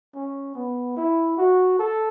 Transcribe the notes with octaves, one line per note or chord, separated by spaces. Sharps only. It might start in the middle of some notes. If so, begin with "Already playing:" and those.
C#4
B3
E4
F#4
A4